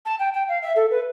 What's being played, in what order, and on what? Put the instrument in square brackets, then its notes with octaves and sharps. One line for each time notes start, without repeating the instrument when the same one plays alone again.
[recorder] A5
G5
G5
F5
E5
A4
B4